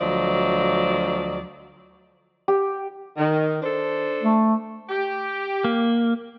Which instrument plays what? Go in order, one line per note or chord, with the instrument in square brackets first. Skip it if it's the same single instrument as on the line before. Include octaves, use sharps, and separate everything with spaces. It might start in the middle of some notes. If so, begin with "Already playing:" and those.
[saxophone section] D2 F3 F#3 D5 D#5
[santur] G4
[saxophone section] D#3
D4 A4 C5
[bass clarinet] A3
[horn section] G4
[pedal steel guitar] A#3